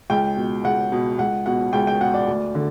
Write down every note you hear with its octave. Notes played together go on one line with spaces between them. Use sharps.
C#2 G5
B2
C#2 F#5
B2
C#2 F#5
B2 F#5
C#2 G5
G5
B2 F#5
D5
D2
D3